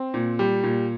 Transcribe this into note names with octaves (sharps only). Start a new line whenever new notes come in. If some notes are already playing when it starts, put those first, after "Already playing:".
Already playing: C4
A#2
G3
A#2